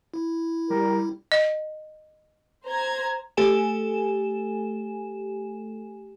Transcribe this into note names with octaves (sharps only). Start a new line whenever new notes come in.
E4
G3 A#4
D#5
C5 A#5 G#6
A3 G4 A4 G#5 E7